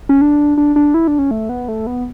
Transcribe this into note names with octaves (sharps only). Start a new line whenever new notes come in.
C#4
D4
D4
D4
E4
D4
C#4
A3
B3
A3
B3